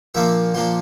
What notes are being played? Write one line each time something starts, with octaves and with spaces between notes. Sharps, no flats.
A#2 F3 A#3 D4 E5
A#2 F3 A#3 D4 C6